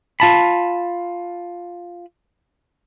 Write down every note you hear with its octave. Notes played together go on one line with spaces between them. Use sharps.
F4 A5 B5